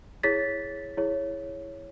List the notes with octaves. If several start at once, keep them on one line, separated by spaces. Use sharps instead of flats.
E4 G#4 C#5 A6 B6
E4 G#4 C#5